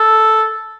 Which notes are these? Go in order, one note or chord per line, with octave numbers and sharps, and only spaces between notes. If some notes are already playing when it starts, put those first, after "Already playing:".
Already playing: A4